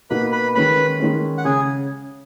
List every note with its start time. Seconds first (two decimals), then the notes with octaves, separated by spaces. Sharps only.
0.10 B2 A#3 D#4 B4 B5
0.32 B4 B5
0.55 D#3 G#3 C#4 B4 B5
1.00 D#3 G#3 C#4
1.38 F#5
1.45 C#3 G#4 G#5